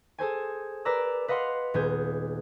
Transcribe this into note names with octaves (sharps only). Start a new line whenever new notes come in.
G#4 A4 C5 G#5
A#4 B4 D5 A#5 E6
B4 D#5 F5 F#5 C6
D#1 B3 G#4 G6